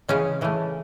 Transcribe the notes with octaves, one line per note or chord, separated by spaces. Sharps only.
C#3 E3 G#3 C#4
C#3 E3 A3